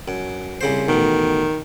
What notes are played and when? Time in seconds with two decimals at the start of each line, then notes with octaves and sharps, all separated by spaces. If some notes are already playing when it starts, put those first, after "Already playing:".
0.08 F#2
0.61 C2 C#3 C5
0.88 A1 B2 D#3